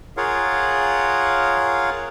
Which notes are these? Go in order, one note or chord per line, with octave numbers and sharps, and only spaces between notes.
F4 G#4 A#4 C#5 F5 F#5